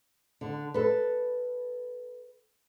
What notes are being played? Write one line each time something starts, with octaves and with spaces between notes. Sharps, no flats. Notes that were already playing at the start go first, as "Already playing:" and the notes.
D3
A4 B4